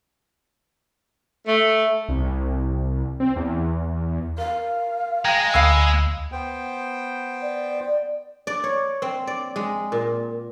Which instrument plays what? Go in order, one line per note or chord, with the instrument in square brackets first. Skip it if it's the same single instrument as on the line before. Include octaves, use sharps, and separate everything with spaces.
[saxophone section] A3
[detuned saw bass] C2
C4
E2
[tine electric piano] A#4 [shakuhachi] F5
[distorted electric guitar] G#3 [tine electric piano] G5 A#5 A#6
[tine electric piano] D2 E6 [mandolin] F5 B5 D#6
[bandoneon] B3 C5 G5
[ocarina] D5
[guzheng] D5
C#5
C4
D5
G#3
A#2